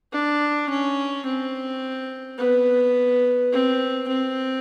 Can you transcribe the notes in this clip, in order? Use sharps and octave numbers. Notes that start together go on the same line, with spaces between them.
D4
C#4
C4
B3
C4
C4